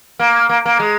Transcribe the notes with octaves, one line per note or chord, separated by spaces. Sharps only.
A#3
A#3
A#3
G#3